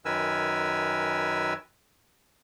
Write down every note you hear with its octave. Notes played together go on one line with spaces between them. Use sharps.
F#2 D#3 A#4 B4 G#5 E6